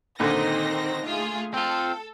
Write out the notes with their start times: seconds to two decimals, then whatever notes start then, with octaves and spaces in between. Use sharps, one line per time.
0.20 A#2 D3 D#3 C4 D#4 A#6
1.04 A3 F4 G#4
1.54 C4 F4 A4